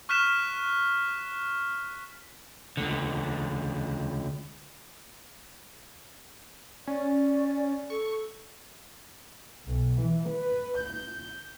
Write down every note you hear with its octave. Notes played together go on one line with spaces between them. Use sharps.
C#6 F6 F#6 B6 E7
C#2 D3
C#4 D5
A4 C#6
B1
E3
B4
G6